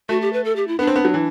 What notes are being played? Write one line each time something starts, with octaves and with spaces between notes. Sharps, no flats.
A3 F#4
G4
B4
A4
G4
E4
B3 D4
C4
B3
F#3
E3